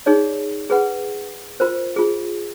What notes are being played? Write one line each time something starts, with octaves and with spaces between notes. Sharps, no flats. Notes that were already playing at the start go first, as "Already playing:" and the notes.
D#4 G#4 C#5 D5
G#4 B4 F#5
F4 A#4 C5
F4 G#4